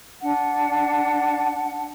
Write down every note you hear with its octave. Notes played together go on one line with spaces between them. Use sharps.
D4 F#5